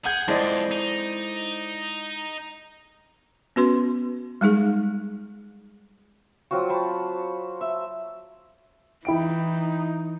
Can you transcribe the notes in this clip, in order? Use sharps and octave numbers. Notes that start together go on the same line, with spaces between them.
G#4 F#5 G6 G#6
F2 G#3 E4 A4 C5 D5 D#5
D#4
B3 C#4 F#4 B4 C6
G3 G#3 D#4 G#4
F#3 C4 F4 F#4
C5 A5 B5
E5
E3 D#4 E4 G5 D7